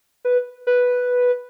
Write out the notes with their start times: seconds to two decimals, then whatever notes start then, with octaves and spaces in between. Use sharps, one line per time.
0.25 B4
0.67 B4